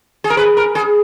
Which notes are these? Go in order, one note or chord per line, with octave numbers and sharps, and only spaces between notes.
G#4
A#4
B4
A#4
G#4